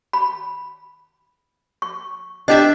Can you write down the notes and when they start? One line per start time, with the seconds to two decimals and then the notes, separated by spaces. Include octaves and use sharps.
0.13 B5
1.82 C#6
2.48 D4 G4 D#5 E5